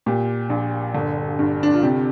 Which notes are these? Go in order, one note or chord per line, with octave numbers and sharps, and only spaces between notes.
A#2 G4
A#1
G1
G2
D4
F4
C3 G4